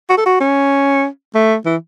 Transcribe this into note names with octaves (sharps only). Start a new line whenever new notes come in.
F#4
A4
F#4
C#4
A3
E3